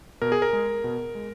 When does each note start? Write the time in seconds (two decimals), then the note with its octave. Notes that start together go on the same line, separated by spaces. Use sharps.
0.22 B2 A#4
0.32 G#4
0.42 A#4
0.53 G#3
0.84 B2
1.15 G#3